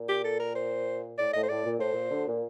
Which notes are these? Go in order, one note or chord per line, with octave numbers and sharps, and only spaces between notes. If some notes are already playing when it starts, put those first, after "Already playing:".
Already playing: A#2
G4
A4
A#4
C5
A2 D5
A2 D#5
C5
A2 D5
A#2
A2 C5
A#2
D2 D3
A#2